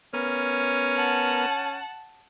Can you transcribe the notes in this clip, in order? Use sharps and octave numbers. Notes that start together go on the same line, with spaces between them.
B3 C#4 A#4 F6
F#5 A5